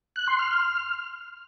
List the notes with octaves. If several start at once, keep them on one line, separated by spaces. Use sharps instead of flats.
F#6
C6
F6
F6